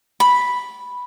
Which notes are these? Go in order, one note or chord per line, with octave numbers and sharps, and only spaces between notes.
B5